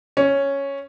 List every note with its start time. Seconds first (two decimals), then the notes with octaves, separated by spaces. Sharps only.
0.17 C#4